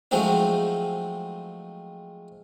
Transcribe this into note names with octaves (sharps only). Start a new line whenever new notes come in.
F3 F#3 G#3 A3 C4 D#4